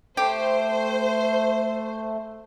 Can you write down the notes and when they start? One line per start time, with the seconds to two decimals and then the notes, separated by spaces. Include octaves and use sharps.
0.17 A3 G4 C5